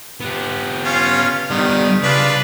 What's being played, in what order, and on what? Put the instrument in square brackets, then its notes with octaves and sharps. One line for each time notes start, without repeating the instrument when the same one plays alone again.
[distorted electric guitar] B3 G4
[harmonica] C#4 F4
[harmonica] D#3 [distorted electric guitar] G3 B3
[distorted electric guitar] C#3 [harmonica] D4 F4 B4